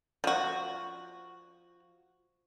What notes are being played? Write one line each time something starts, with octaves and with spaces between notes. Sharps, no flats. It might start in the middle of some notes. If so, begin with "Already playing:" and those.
F3 F#4